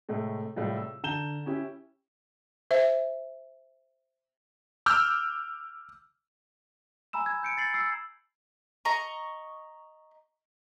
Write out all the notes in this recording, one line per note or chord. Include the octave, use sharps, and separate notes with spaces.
A2 C3 G#3 A3
A2 C3 G3 G#3 F4
E6
D3 A5 A#5 G6 E7 G7
C#4 E4 G4
C5 E5
D6 E6 F6 G6
G#5 A#5 B5 E6 E7
G#6
G6 C#7 D7
A6 C7 F#7
E6 C7
D#5 A#5 C#6